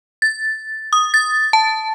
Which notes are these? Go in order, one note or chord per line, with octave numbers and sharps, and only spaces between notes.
A6
D#6
A6
A5